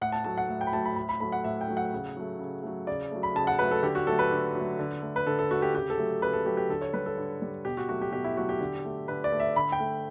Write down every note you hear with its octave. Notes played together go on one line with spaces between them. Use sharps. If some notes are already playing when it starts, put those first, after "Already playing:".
A2 F#5
A5
F#3 A3 A5
F#5
A2
G5
B5
F#3 A3 A5
B5
A2 B5
B5
F#3 A3 B5
F#5
A2 E5
G5
F#3 A3
F#5
C#3
F#3 A3
C#3
F#3 A3
C#3 D5
F#3 A3
B5
C#3 A5
F#5
F#3 A3 B4
A4
D3 G4
F#4
F#3 A3 A4
B4
D3
F#3 A3
D3
A3
B4
D3 A4
A4
A3 F#4
G4
C#3 G4
A4
F#3 A3
C#3 B4
A4
F#3 A3 G4
G4
D3 A4
C#5
G3 B4
A4
D3
G3
B2 G4
F#4
F#3 A3 F#4
G4
B2 G4
E4
F#3 A3 F#4
G4
D3
A3
D3 B4
D5
A3
E5
D3 B5
G5
A3